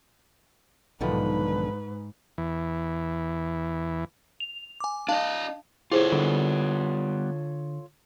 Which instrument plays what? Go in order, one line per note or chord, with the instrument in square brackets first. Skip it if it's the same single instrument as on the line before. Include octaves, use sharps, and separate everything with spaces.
[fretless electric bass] B1 [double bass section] G#2 [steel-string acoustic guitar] D3 D#3 F3 [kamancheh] B4
[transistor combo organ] E2 E3
[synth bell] F7
G#5 D6
[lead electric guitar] D4 D#5 [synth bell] F5 A5
[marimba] E4 G#4 C5 [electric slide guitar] F4 A4 C#5
[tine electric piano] D3 [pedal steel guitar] G3 B3